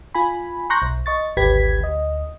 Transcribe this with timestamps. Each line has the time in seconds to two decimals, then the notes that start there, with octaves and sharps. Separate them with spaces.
0.15 F4 G#5 B5
0.70 A#5 C6 C#6 F#6 G6 A#6
0.82 B1
1.06 D#5 C#6 A6
1.37 G#1 D2 G4 B4 G#6 B6
1.80 D2 D#5